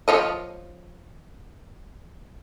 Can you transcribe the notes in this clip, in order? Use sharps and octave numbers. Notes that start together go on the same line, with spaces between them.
F3 C#5 D#5